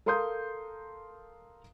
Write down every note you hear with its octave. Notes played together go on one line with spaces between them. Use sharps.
A4 A#4 F5 C6 D#6 G6